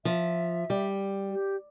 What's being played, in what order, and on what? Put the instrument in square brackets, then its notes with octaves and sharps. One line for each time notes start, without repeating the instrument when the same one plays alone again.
[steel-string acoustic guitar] F3 [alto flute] E5
[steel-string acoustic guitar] G3
[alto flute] G4